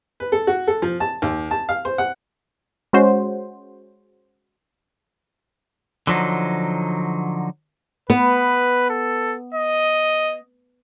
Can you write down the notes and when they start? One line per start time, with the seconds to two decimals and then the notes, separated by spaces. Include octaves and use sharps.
0.20 B4
0.32 A4
0.47 F#4
0.67 A4
0.82 F3
1.00 A5
1.22 D#2
1.51 A5
1.69 F5
1.85 C5
1.98 F#5
2.93 G#3 C#4 F#4 C5
6.07 D3 F3 F#3 D#4
8.10 B3 B4
8.90 A4
9.55 D#5